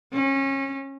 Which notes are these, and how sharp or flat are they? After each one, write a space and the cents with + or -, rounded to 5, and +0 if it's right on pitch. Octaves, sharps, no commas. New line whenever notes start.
C#4 -25